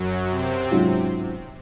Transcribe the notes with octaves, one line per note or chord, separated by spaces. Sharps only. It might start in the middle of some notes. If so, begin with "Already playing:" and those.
Already playing: F#2 F#3
C3 C4
G#2 F#3 C#4 F4